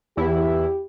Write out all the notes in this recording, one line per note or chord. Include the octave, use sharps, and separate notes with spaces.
E2 E4 G4